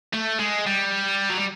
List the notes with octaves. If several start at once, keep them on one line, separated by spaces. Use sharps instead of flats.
A3
G#3
G3
F#3
G3